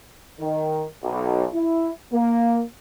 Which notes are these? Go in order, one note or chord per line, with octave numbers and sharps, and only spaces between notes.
D#3
B1
E4
A#3